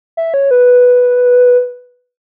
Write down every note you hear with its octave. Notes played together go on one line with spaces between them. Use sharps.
E5
C#5
B4